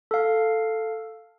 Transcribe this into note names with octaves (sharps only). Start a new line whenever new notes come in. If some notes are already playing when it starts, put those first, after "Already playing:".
A4 F5